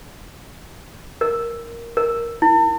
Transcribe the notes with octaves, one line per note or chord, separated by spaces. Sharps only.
A#4
A#4
E4